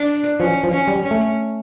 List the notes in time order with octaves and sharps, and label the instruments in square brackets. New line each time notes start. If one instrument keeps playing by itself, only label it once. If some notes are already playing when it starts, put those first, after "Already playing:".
Already playing: [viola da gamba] D4
[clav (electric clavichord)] F3 [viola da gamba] C#4
[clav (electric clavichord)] F3
[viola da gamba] C#4
[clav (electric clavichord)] G3
[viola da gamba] C#4
[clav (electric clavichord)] A3